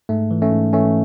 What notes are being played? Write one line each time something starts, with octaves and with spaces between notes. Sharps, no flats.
G#2 A3
E3
A3 C#4
G#2
E3 A3 C#4